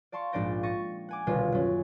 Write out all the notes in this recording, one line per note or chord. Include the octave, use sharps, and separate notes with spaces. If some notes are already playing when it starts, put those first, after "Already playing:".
D5 F5 A5 C6 C#6
A#1 G#2 D4 D5 G5 A#6
C#6 A6 A#6 D#7
F#5 G#5 D6
D#1 C2 B2 D3 F4
F#2 C#4